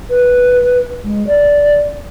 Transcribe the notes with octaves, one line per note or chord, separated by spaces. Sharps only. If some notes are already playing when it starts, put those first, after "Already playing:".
B4
G#3
D5